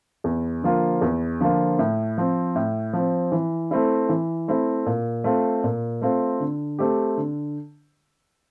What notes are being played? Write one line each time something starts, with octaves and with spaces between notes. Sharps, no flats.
E2
D3 F3 A#3 F4
E2
D3 F3 A#3 F4
A2
F3 C4
A2
F3 C4
E3
A3 C4 E4
E3
A3 C4 E4
A#2
A3 C4 F4
A#2
A3 C4 F4
D3
A3 C4 G4
D3